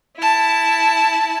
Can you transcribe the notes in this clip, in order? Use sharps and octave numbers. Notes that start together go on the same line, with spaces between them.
E4 A5